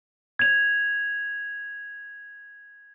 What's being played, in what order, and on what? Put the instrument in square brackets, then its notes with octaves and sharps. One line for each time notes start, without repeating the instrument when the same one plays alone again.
[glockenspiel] G#6 F7